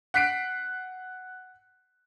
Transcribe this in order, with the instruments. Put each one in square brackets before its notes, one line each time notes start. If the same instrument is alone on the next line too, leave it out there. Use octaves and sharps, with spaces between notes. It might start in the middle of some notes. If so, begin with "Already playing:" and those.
[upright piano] F#5 F#6 B6 C7 D7